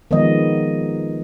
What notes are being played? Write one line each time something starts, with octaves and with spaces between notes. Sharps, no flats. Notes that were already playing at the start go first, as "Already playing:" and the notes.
D#3 F3 G#3 B3 D#5